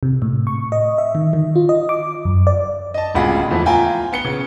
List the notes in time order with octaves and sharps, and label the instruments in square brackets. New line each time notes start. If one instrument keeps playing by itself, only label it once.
[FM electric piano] C3
A2
C#6
D#5
E5
D#3
D#3
F4
D#5
D6
F#2
D5
[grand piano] D#5 A5
D1 C#2 F4 G#4 F#5 B5
E2 E3 F3 A3
F4 G5 G#5 A#5
B3 C#7 G7
C#3